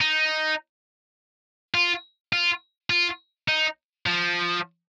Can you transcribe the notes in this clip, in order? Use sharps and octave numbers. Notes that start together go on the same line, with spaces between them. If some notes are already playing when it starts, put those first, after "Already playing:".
D#4
F4
F4
F4
D#4
F3